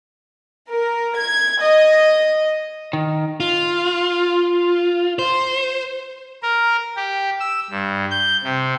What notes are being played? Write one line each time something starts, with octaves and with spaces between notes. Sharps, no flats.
A#4
G#6
D#5
D#3
F4
C5
A#4
G4
E6
G2
G6
C3